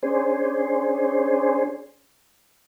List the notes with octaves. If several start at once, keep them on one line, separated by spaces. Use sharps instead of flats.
C#4 D4 G#4 C5